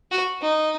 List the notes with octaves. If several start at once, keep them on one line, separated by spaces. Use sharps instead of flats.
F#4
D#4